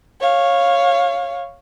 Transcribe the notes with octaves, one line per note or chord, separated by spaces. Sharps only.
C#5 F5